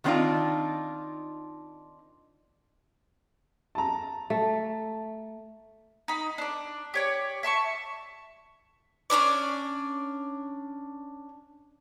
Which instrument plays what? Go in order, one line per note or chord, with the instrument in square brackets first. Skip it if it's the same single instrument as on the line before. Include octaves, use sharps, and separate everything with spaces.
[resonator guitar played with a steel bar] D#3 F#3 C4 D4 D#4 F4
[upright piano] A5 A#5
[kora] A3
[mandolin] D#4 B5
D4 D5
G4 C#5 D5
E5 A5 C6 C#6
C#4 D4 E4 D5